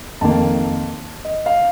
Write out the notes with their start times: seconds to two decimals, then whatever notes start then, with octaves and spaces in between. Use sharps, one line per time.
0.21 F2 D#3 A#3 A5
1.25 D#5
1.46 F5